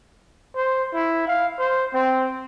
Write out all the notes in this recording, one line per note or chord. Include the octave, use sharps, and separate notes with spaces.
C5
E4
F5
C5
C4